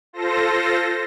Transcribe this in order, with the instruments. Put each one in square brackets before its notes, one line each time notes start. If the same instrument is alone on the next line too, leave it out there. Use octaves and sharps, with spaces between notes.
[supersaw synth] F4 A4 C5 A#6